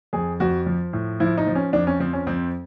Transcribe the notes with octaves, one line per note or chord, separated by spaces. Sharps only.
F2 G#4
F2 F#4
F3
A2
F3 E4
D#4
F3
C#4
F2 D4
C#4
F3 C4
C#4
F2 C4